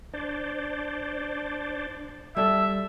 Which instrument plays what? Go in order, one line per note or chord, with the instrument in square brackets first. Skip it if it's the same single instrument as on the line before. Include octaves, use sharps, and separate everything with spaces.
[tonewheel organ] D4 C5 D5
[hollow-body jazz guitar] G3 A4 [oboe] E5